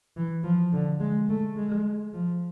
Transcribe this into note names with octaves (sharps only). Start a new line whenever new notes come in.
E3
F3
D3
G#3
A3
G#3
F3